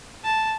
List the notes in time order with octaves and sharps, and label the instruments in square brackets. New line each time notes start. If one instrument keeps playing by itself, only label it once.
[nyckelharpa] A5